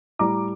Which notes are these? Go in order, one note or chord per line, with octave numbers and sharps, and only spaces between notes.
A2 G3 A#5 D6